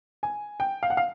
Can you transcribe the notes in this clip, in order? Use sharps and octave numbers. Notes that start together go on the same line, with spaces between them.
G#5
G5
F5
F#5
F5